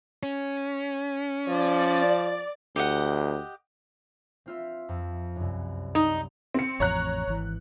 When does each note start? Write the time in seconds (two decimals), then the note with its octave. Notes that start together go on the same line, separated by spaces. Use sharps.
0.23 C#4
1.49 F3 D5
2.76 D2 G4 D#5 F#5
4.46 C4 F4 E5
4.89 F2
5.36 C2 F#2
5.95 D#4
6.54 C4 C#7
6.80 A1 F2 C#5 A#5 F#6
7.27 G#1 E3